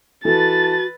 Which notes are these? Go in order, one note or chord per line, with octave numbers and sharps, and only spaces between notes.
E3 F#4 A4 B4 A5 A6